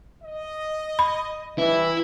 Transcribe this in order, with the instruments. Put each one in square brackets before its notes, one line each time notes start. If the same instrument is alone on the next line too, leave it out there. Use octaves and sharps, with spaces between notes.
[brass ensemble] D#5
[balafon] B5
[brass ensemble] C3 G3 [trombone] E3 [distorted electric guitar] E4